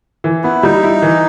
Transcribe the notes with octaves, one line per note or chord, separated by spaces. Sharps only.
E3
B3 E4
G3 D#4
E4
E3